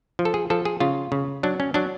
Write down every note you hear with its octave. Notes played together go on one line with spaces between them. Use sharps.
F3
A4
G#4
F3 A4
G#4
C#3 F4
C#3
F#3 D4
C#4
F#3 D4